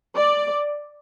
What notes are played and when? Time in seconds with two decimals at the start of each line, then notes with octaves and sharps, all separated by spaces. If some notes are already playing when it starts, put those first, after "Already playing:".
0.16 D5